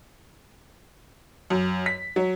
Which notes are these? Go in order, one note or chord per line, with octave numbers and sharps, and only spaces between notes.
F#2
B6
F#3